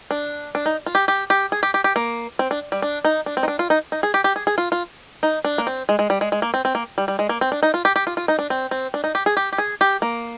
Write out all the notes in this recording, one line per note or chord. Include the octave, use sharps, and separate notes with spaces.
D4
D4
D#4
F4
G4
G4
G4
G#4
G4
G4
G4
A#3
C4
D4
G3
D4
D#4
D4
C4
D#4
D4
F4
D#4
D#4
G#4
G4
G4
G#4
G#4
F4
F4
D#4
D4
A#3
C4
G#3
G#3
G3
G#3
G#3
A#3
C4
C4
A#3
G3
G3
G#3
A#3
C4
D4
D#4
F4
G4
G4
F4
F4
D#4
D4
C4
C4
D4
D#4
G4
G#4
G4
G4
G#4
G4
A#3